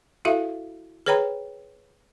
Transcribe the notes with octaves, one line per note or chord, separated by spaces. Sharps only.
E4 F#4 A4 E5 F5
G#4 B4 C#5 G5 A#5 B5